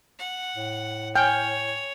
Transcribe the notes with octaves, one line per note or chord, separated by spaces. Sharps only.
F#5
A2
C#5 G5 G#5 F6